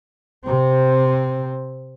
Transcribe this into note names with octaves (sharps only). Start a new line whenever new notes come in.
C3 C4